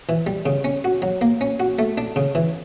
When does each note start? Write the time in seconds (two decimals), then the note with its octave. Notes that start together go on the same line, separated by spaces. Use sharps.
0.09 E3
0.27 G3
0.46 C#3
0.64 C#4
0.84 F#4
1.02 F#3
1.21 A#3
1.41 C#4
1.60 F#4
1.79 A3
1.98 D4
2.16 C#3
2.35 E3